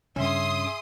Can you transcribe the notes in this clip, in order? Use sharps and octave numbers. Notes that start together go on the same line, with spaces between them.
G2 C#3 C#4 G#4 E5 C6 D#6